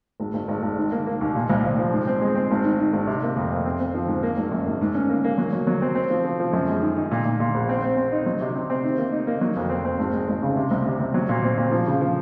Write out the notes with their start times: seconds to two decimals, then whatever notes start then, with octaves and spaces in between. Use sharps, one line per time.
0.20 G#1
0.34 G#1
0.48 G#1
0.62 G#1
0.78 D#3
0.92 A#3
1.06 A#3
1.21 D#2
1.35 A#2
1.50 C2
1.64 C2
1.78 F3
1.93 G#2
2.07 C4
2.21 G#3
2.35 C4
2.51 G#1
2.64 D#3
2.79 D#3
2.93 G#1
3.07 C3
3.22 A#3
3.36 F2
3.51 F2
3.65 C4
3.80 C4
3.94 F3
4.08 G#2
4.23 A#3
4.37 G#1
4.51 F#2
4.67 G#1
4.81 G#2
4.95 C#4
5.09 A#3
5.24 A#3
5.38 F#3
5.53 F#3
5.67 F#3
5.82 C4
5.95 C4
6.10 F3
6.24 F3
6.40 F3
6.53 F#2
6.68 G#3
6.82 D#3
6.96 D#3
7.11 A#2
7.25 A#2
7.40 A#2
7.55 A#1
7.69 C4
7.82 C4
7.97 C4
8.12 D#4
8.26 F#3
8.41 C3
8.55 C3
8.70 C4
8.84 D#3
8.98 A#3
9.12 D#4
9.27 A#3
9.41 F#3
9.56 F2
9.70 C4
9.85 C4
9.99 G#1
10.13 G#3
10.28 G#1
10.42 C#3
10.56 C3
10.71 C2
10.86 C3
11.00 C2
11.14 F#3
11.29 A#2
11.43 C4
11.58 A#2
11.71 F3
11.87 C#3
12.01 F3